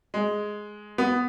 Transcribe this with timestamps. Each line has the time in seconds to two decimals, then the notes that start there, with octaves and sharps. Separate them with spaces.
0.14 G#3
0.98 B3